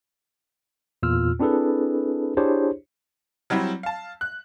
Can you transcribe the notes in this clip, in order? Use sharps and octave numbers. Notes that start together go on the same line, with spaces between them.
E2 A#2 F4 E6 F6
C4 D4 E4 G#4 A4 B4
D4 E4 G4 G#4 C5 C#5
F#3 G3 C4 E4
F5 A5
F#6